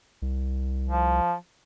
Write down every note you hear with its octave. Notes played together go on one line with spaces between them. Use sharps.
C2
F3